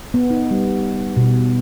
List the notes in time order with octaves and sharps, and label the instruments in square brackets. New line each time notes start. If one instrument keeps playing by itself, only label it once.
[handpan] B3
D#4
G3
B2